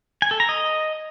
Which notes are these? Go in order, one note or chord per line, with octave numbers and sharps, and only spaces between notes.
G#5
A4
A#5
D#5